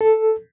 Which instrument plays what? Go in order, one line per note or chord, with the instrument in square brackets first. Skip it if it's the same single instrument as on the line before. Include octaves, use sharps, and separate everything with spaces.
[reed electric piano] A4